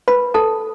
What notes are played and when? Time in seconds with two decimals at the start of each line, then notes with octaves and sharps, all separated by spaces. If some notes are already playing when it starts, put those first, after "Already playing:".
0.08 B4 B5
0.34 A4 A5